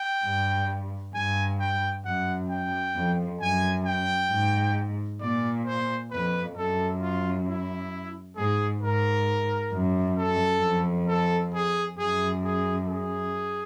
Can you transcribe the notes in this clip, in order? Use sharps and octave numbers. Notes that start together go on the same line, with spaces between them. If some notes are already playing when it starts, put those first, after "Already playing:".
Already playing: G5
G2
G2 G#5
G5
F#2 F#5
G5
F2
F#2 G#5
G5
G#2
A#2 D5
C5
F2 B4
F#2 A4
F4
E4
G#2 G#4
G#2 A#4
F#2
A4
F2
A4
G#4
F#2 G#4
G#4
G#4